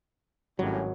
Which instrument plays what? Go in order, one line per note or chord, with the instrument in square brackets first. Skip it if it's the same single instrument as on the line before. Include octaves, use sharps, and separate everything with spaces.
[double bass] G#1 [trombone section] A2 G3 C#4 [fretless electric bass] F#3